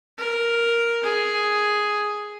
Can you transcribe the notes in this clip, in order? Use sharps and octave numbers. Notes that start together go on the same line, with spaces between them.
A#4
G#4